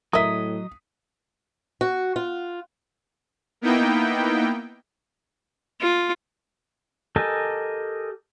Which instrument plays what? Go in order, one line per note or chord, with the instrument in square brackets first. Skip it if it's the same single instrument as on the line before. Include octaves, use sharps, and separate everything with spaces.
[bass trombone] A2 [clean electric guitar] F#3 D#5 [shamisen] A#4 E5 [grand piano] D#6 B6
[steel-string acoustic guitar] F#4
F4
[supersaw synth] A#3 B3 D#4 E4 G5
[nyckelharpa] F4
[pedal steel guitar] G4 A4 A#4 D#5 G#5